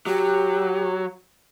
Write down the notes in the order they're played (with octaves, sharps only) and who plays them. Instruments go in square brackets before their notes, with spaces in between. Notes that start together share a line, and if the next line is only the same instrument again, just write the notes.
[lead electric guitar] F#3 [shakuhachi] G4